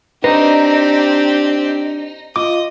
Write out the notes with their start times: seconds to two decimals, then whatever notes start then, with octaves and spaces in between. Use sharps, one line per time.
0.24 C4 D4 D#4 G4 B4
2.36 F4 D#5 D6